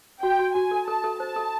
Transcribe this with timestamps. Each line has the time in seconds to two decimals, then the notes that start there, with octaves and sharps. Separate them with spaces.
0.22 F#4 G5
0.39 F#4
0.55 F#4 G#5
0.71 A4
0.88 A4 A5
1.04 A4
1.20 C5 A5
1.36 A4